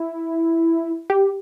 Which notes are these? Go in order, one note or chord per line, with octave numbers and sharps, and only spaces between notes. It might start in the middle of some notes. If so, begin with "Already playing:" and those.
Already playing: E4
G4